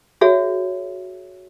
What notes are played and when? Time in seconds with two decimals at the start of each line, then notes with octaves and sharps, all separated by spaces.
0.21 F#4 G#4 C#5 E5